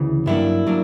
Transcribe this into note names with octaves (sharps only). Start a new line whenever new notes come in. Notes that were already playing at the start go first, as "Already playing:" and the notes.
Already playing: D2 C#3 E3
G2 F#3 A#3 D4 E4
F#3 A#3 D4